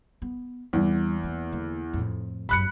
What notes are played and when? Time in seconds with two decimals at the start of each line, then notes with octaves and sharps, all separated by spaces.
0.22 B3
0.73 E2 G3 C4
1.23 A#3 B3
1.52 D3 A#3
1.93 F2 A2
2.49 G1 F#2 B5 F#6 C#7